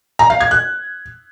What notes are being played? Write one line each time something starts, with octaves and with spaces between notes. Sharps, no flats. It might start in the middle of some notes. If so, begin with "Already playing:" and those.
A#5
F5
G#6
F#6